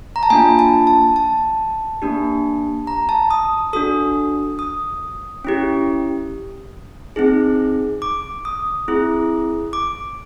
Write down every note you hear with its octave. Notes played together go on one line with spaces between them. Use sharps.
A#5
A5
A#3 D4 F4 G#5
A5
A5
A5
A#3 D4 G4
A#5
A5
D#6
D4 F#4 A4 D#6
D#6
C#4 E4 G4
C4 D#4 G#4
D6
D#6
C4 E4 G#4
D6